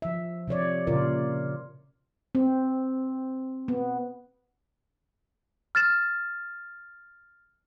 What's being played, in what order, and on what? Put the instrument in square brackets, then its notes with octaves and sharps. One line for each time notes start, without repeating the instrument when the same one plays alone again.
[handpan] F3 E5
C3 F3 C#5 D5
A#2 C#3 F4 A#4 D5
C4
B3
[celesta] F6 A6 E7